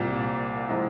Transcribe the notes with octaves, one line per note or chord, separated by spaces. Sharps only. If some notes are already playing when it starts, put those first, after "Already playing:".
Already playing: C2 A#2 G3 C4
C3 F3 G#3 C4 E4